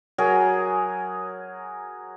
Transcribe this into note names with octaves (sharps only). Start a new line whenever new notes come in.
F#3 G#4 A#4